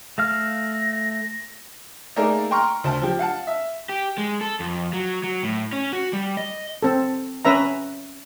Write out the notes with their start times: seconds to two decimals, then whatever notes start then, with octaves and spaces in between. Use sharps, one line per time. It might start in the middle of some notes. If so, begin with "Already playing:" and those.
0.18 A3 F5 F6 A#6
2.16 A3 A#3 D#4 G#4 A#4 D5
2.51 G5 A#5 C6 C#6 F6
2.84 D2 C5 A5
3.02 F3 G4
3.19 F5 F#5 A5
3.47 E5
3.89 G4
4.18 G#3
4.41 A4
4.60 F2
4.93 F#3
5.24 F#3
5.43 A2
5.73 C#4
5.93 F#4
6.13 G3
6.37 D#5
6.83 C4 A4
7.45 C#4 B4 E5 A#5